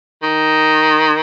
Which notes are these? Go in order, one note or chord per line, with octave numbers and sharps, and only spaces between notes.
D#3